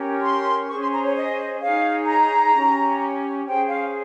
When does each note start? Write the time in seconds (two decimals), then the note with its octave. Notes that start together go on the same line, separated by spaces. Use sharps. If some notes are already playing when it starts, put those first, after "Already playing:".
Already playing: C#4 G4 A#4 C#5
0.22 C6
0.68 C#4 G#4 C5 C#6
0.80 C6
0.92 A#5
1.03 C#5
1.15 D#5
1.61 D#4 G#4 C#5 F5
2.07 A#5
2.53 C#4 G4 C#5
3.45 C#4 G#4 C5 G5
3.68 F5